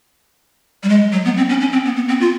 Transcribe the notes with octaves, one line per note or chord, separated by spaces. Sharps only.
G3
G#3
F#3
B3
C4
C#4
C#4
C4
B3
B3
C4
F4